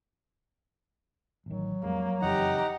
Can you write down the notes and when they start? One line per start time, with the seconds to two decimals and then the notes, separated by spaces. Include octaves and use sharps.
1.46 A1 D#3 F#3
1.83 F2 G3 G#3 A#3
2.22 F#1 F2 E3 D#4 G4 F#5 A#5